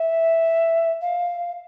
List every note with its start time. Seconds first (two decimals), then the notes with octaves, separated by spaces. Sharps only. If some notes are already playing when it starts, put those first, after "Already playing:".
Already playing: E5
1.01 F5